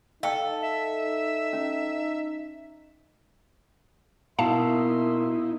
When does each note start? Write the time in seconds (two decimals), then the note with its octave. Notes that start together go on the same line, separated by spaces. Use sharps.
0.23 D#4 A4 F5 G5 A5
0.62 E5
1.53 C#4
4.39 B2 A#3 D#4 E4 E5 F5 A5 C6